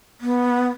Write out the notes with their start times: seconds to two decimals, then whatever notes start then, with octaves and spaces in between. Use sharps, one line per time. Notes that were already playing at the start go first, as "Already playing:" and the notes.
0.21 B3